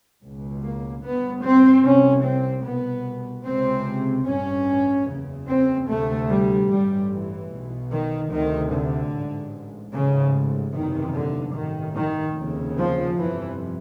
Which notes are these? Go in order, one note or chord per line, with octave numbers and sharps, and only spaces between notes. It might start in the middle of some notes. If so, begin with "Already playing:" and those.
C#2 B2
A#3
G1 G2 B3
C4
C2 C3 C#4
C4
C2 B2 B3
C#2 C3 C4
A1 G2 C#4
F#1 E2 C#3
C4
D2 C3 A3
G3
A1 G2 G3
E3
B1 B2
D#3
D2 C3 D#3
D3
A1 G#2
A1 G#2 C#3
F#1 E2 C3 D#3
D3
A1 G2 D#3
D#3
F1 D#2 C#3
F3
G1 F2 C3 E3